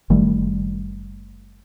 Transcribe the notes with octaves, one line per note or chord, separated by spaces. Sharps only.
F#1 D#3 G3 A3